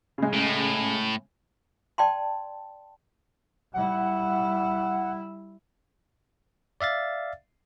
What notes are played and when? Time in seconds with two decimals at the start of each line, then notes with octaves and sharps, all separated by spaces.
0.18 C#3 G#3
0.33 A2
1.98 D5 G5 A5 C6
3.74 G3 E4 F#5
6.81 D5 E5 F5 A6